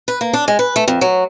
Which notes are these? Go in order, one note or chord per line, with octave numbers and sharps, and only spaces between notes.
B4
A#3
D4
G#3
B4
A3
F2
F#3